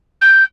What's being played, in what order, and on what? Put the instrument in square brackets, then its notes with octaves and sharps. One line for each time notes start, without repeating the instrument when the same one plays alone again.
[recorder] G6